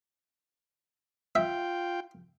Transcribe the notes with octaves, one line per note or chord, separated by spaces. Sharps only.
F4 E5 G5